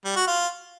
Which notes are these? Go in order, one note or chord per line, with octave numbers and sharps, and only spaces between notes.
G3
F#4
F4